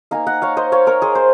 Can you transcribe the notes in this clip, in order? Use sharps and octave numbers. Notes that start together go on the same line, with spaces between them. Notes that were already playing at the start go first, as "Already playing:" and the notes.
A#3 D#4 F5 G#5
D#5 F#5
C#5 F5
C5 D#5
C#5 F5
A#4 C#5
G#4 C5
C5